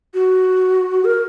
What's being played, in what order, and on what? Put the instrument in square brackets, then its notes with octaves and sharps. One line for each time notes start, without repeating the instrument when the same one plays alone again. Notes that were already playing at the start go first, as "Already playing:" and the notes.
[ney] F#4
A#4